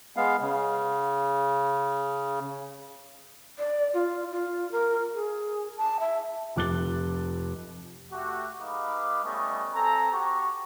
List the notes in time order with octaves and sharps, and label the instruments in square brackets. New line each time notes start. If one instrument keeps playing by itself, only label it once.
[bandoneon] G#3 B3 F5
C#3
[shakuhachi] D5
F4
F4
A#4
G#4
A5
E5
[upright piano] F1 F2 D6 F#6 A6 G7
[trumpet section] A3 F#4 G4
G#3 D#4 B4 F5 B5 D6
G3 A3 B3 C#4 D#5 C#6
C4 A4 G#5 A#5
F#4 G4 A5 C#6